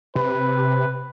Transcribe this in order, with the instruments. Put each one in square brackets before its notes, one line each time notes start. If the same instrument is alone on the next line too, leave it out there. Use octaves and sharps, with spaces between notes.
[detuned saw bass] C3 [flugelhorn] B4